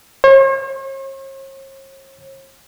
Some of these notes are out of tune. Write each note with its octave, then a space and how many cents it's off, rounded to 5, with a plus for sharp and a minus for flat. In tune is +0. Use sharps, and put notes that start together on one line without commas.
C#5 -45